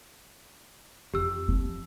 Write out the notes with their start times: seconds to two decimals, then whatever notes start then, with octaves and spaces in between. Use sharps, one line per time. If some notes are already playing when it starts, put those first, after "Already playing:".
1.14 F2 G4 E6
1.48 F3 C4